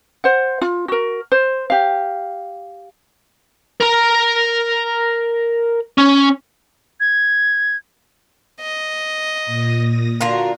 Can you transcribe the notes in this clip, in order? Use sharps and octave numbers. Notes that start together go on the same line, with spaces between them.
C5 F#5
F4
F#4 A#4
C5
G4 F5
A#4 A#5
C#4
G#6
D#5
A#2 D#6 A#6
D3 F4 F#4 A#4